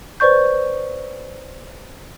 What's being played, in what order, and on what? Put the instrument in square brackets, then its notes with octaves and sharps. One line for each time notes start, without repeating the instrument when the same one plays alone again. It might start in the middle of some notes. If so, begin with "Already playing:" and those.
[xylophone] B4 C5 D5 C#6 G6